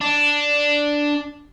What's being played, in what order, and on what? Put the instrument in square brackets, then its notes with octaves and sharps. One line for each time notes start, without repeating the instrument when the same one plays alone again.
[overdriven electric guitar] D4